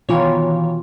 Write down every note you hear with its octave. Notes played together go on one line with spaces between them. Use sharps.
B2 D#3 E3 F4 C#5